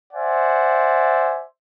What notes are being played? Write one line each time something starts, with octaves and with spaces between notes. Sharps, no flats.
C5 D5 E5 F#5 G#5